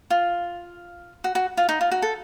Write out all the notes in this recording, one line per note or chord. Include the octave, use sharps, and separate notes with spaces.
F4
F#4
F#4
F4
D#4
F4
F#4
A4